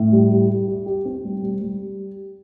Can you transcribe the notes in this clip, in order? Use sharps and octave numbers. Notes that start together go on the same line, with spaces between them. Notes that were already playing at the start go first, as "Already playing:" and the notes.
Already playing: A2
G3
G3
G3
G4
G4
C4
G3
G3
G3